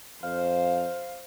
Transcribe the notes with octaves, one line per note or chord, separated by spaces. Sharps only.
F2 C5 F5